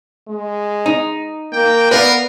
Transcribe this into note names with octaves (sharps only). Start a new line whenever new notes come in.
G#3
D#4
A#3 G5
B3 A#4 B4 D5 F5